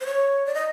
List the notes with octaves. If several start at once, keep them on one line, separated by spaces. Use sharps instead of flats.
C5
C#5
D5
D#5